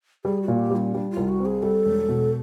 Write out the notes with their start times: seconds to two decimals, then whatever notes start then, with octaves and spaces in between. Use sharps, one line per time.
0.25 G3 G#4
0.42 F#4
0.48 A#2
0.59 G4
0.71 G3
0.76 C#4
0.94 G3 D4
1.11 F4
1.17 C2
1.28 F#4
1.40 C4
1.46 G#4
1.63 G3 A4
1.85 E1
2.08 B2